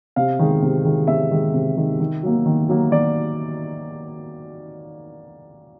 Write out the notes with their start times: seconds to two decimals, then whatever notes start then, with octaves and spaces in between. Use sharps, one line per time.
0.16 C3 F5
0.39 D#3 G#3
0.62 C3
0.85 D#3 G#3
1.07 C3 E5
1.31 D#3 G#3
1.54 C3
1.77 D#3 G#3
2.00 D#3
2.23 F#3 A#3
2.46 D#3
2.69 F#3 A#3
2.91 D#3 D5